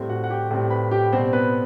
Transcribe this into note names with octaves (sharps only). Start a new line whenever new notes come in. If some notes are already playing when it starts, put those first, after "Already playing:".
Already playing: A2 G3 C4
F#4 F#5
F#5
G4 G5
A2 G3 C4
B4 B5
G4 G5
B2 G3 C4 C5
B3 B4